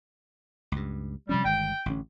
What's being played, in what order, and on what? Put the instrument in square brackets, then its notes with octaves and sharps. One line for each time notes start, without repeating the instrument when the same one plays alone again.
[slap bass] C#2 G2
[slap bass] C3 F3 C#4 [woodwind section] G3
[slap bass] G1 D#3 G#3 [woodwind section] G5
[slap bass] A1 D3 C#4